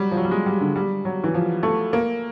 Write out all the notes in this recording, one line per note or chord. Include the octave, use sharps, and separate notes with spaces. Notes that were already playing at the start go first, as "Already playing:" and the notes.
Already playing: F#3 G3
F3
F#3
G3
G#3
G3
D3
G3
F#3
E3
F3
A3
A#3